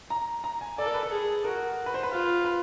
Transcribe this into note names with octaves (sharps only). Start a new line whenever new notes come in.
A#5
A#5
G#5
A4 D5
A#4
B4
A4
G#4
F#4 A#4
B4
C5
B4
F4
B4